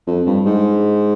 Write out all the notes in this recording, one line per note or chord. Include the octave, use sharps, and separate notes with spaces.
F2
G2
G#2